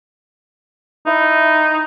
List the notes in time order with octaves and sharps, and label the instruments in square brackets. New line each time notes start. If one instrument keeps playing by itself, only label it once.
[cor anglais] D#4 [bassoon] E4